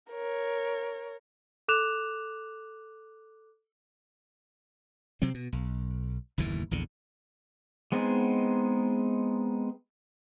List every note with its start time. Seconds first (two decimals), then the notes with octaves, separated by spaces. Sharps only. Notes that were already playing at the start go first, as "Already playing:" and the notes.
0.11 A#4 C#5
1.68 A4 D6 F#6 E7 F7
5.22 C3 F#3 C4
5.34 B2
5.52 B1
6.38 F#1 D#2 A2 E3
6.71 A#1 E2 D3
7.92 G#3 B3 C4 D#4 G#4